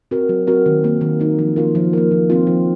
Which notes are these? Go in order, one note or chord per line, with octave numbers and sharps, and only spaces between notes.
C4 F#4 A#4
F#3
C4 F#4 A#4
D#3
A#3 D#4
D#3
A#3 D#4
F3
A#3 F4 A#4
F3
A#3 F4 A#4
F3
C4 F4
F3